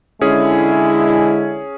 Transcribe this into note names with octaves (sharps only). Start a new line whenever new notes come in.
D3 G#3 C#4 E4 G#4